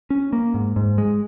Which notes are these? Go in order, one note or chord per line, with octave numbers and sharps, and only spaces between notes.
C#4
A#3
G#2
G#2
G#3